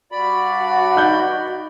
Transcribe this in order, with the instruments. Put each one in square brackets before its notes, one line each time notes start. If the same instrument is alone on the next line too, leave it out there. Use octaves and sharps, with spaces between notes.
[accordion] G2 D5 B5 [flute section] F#4
[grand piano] D#4 F#6 G6